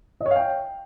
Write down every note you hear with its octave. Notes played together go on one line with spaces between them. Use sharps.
D#5
C#5
F5
G5